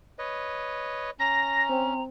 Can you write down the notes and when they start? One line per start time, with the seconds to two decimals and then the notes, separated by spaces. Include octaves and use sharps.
0.19 B4 C#5 D#5
1.20 C#4 A#5 A#6
1.69 C4